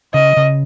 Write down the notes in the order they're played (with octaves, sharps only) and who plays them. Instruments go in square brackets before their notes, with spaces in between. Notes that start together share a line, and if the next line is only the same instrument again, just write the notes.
[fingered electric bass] C#3 [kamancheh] D#5
[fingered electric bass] C#3